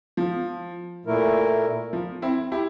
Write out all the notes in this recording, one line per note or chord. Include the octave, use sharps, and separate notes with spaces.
F3
A#2 A3 E4 A#4
F3
C4 E4
E4 G4